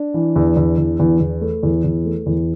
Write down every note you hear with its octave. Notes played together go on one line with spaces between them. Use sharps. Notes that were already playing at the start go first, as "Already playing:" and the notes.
Already playing: D4
E3
E2
E2
E2
E2
E2
A3
E2
E2
A3
E2